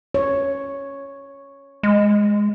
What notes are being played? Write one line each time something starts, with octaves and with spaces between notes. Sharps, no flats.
C#5
G#3